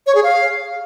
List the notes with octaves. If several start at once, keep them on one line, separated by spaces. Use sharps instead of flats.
C#5
G#4
F5